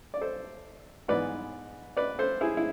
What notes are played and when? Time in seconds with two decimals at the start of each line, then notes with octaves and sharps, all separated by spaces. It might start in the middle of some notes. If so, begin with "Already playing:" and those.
0.14 D5
0.21 A4 C5
1.08 G#2 E3 B3 B4 D5
1.97 B4 D5
2.19 A4 C5
2.41 E4 G#4
2.57 E4